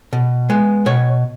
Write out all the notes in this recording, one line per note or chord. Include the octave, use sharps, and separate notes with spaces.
B2
G#3 B3
B2 C#5